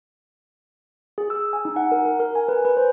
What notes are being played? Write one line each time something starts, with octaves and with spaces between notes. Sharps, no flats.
G#4
E6
G#5
D#4
F#5
A#4
A#4
A#4
G#5
B4
B4
C5